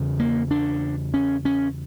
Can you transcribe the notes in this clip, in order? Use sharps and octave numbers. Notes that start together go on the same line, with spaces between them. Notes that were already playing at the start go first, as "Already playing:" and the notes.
Already playing: E2 C#3
A#3
D4
C#4
C#4